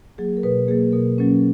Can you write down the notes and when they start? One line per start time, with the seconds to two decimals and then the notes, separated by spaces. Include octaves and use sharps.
0.18 F#3 A#3 G#4
0.37 A#4
0.43 B2 B4
0.68 F#3 A#3 G#4
0.92 B2 A#4
1.18 F#3 A#3 C#4